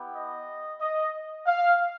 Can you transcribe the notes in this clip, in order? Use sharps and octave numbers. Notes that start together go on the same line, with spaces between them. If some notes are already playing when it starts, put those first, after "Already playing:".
Already playing: B3 E4 G4
D#5
D#5
F5